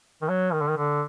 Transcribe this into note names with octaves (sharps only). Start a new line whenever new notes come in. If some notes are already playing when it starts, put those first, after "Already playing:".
D#3
F#3
D#3
D3
D#3
D3